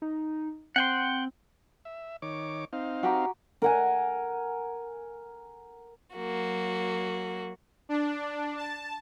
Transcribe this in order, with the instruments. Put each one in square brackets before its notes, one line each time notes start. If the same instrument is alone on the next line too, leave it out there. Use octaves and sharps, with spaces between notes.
[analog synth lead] D#4
[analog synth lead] C4 [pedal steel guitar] F#5 G5 C6
[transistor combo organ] E5
D#3 C#5 D6
C4 D#4 F5
[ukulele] F#4 G4 A#5
[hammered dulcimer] A#4 F#5 G#5
[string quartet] F#3 A#3 F#4
[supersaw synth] D4
A5